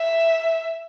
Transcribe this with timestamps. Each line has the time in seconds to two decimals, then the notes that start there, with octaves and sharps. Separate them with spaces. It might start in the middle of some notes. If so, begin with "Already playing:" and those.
Already playing: E5